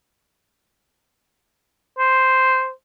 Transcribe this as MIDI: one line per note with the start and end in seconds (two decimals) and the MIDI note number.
1.99 2.70 72